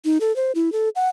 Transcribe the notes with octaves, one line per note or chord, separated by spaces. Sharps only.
D#4
A4
C5
E4
A4
F#5